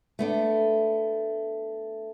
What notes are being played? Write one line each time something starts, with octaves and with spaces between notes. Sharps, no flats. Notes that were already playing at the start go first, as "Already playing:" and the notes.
A3 B3 D4